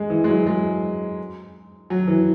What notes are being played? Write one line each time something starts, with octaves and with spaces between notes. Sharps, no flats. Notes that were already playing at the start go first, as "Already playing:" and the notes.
Already playing: G#3
E3
G#3
F#3
G#3
F#3
E3